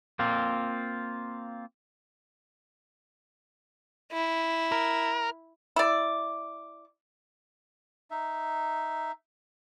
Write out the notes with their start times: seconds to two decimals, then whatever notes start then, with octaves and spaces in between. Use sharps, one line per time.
0.19 A#3 C4 F4
4.12 E4
4.72 A#4
5.76 E4 D5
8.11 D#4 E5